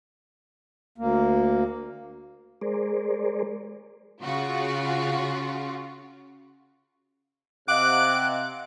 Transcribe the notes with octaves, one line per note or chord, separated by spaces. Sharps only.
D2 A#3
G#3 G#4 A#4 C5 D5
C#3 F4 F#4
C3 D#5 F5 F#5 D6 F#6